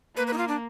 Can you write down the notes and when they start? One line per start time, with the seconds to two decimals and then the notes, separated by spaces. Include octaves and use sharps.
0.16 A#3 B4
0.27 B4
0.33 D#4
0.38 F4
0.48 D4